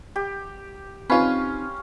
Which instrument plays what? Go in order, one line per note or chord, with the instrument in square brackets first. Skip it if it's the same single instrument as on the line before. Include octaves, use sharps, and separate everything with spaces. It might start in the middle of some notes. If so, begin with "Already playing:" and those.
[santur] G4
[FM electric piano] C4 D#4 [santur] C#4 F5 [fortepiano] F4 B4